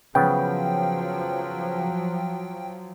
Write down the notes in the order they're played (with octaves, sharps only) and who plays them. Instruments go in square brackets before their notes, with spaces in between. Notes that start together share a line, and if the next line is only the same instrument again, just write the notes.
[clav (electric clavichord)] C#3 B3 [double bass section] F3 F#3 [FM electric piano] G5